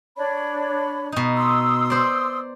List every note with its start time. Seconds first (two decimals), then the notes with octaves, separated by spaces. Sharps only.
0.17 D4 C#5 B5
1.12 B2 D#4
1.37 C6 D#6 E6
1.90 C5 D5